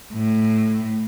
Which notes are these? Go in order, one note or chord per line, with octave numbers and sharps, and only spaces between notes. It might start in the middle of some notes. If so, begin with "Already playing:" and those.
A2